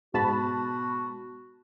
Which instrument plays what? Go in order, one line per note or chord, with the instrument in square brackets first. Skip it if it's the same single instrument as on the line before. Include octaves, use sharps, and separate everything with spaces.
[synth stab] G#2 A5 B5 [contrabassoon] B2 [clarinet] F#4